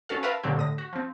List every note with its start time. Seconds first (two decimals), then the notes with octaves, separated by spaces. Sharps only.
0.09 C#4 F#4 A4 F5
0.23 A#4 B4 E5 F5 A5 B5
0.43 A#2 D3 F#3 C4 G4
0.56 A2 D3 D#6 A#6
0.78 F#4
0.93 F3 C4